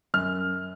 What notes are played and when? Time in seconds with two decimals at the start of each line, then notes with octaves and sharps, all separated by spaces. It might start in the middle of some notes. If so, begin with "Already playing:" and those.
0.14 F#2 F6